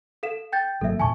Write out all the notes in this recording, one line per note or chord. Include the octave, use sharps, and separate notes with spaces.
A4 F5 E7
G5 G6 A6
G#1 F#3 A#3 A4 E5
E2 A#2 E3 G#5 A5 C#6